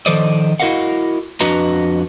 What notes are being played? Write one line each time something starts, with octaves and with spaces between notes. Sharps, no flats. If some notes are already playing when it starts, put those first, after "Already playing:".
D#3 F3 A4 C5 D5 D#5
E4 F#4 A#4 D#5 F5 F#5
F2 D4 F#4 B4 D#5 A#5